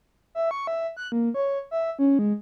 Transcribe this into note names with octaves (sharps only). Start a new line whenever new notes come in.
E5
C#6
E5
F#6
A#3
C#5
E5
C#4
G#3